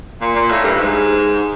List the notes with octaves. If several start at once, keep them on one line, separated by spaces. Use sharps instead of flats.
A#2
A#2
A2
G2
G#2